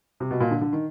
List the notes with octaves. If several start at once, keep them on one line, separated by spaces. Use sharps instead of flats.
C3
B2
A#2
D3
D3
D#3